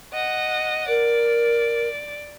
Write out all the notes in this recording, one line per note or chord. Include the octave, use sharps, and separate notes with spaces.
D#5 F#5
A#4 D5